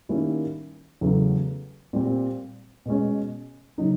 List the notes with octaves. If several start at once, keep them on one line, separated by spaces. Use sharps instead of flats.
D#3 G3 A#3 C#4 E4
E2 C#3 F#3 A3
A#2 G3 C4
B2 G#3 C#4
C#3 F#3 A#3 D#4